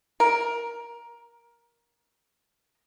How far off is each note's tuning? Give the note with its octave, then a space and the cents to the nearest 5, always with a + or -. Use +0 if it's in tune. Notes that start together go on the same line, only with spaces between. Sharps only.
A#4 +15